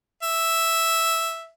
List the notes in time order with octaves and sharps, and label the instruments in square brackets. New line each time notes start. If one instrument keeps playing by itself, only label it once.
[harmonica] E5